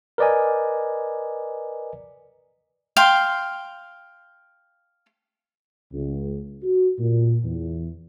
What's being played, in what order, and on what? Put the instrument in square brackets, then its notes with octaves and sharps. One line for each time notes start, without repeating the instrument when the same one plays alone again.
[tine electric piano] A#4 B4 D5 D#5 G#5
[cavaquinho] F5 G5 C6
[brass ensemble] C#2
F#4
A#2
E2